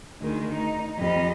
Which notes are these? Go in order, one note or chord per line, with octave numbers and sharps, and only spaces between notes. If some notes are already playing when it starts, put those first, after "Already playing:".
D2 D#3 G#3
D#4
F2 G3 D#5